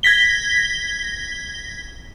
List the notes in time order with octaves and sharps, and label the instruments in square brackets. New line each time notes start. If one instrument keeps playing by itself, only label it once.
[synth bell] G#6 A#6 B6 G7